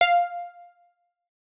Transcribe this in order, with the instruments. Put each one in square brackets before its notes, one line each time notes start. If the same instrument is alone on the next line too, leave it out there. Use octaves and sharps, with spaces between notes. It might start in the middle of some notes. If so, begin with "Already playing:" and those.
[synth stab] F5